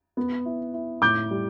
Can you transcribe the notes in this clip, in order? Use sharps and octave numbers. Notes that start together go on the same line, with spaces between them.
B3
E4
E4
A2 D6 G6
G3